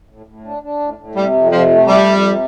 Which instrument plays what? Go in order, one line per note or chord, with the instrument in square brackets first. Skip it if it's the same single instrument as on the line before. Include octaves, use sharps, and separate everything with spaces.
[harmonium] A2
A2
D4
D4
A2
A2
[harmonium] C3 [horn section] G3
[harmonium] F2
[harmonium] C3 [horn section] F3
[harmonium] A3
[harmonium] F2 [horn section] G3
[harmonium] F2
C3